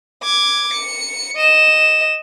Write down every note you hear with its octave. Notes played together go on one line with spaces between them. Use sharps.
D6 G#6
C#7
D#5 E7